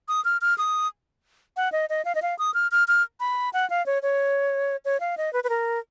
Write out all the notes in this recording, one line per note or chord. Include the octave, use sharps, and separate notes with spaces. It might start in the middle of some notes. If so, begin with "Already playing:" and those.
D#6
F6
F6
D#6
F#5
D#5
D#5
F5
D#5
F5
D#6
F6
F6
F6
B5
F#5
F5
C#5
C#5
C#5
F5
D#5
B4
B4
A#4